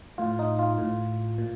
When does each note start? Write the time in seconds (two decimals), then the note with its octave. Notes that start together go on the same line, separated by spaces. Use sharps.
0.18 A2 F4
0.39 D#4
0.59 F4
0.78 A2
1.38 A#2